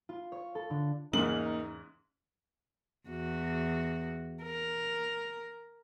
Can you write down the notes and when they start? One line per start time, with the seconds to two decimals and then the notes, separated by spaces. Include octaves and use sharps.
0.09 F4
0.32 C#5
0.55 A4
0.70 D3
1.13 E2 G#2 C#3 A#3 D#4 F#7
3.09 E2 F#4
4.43 A#4